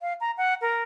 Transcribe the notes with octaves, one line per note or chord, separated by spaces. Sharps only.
F5
A#5
F#5
A#4